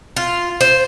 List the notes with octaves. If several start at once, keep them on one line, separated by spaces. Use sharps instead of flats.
F4
C5